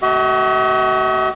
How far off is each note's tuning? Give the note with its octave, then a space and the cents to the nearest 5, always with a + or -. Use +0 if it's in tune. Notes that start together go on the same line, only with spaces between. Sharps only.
A3 +0 F#4 +35 D#5 +45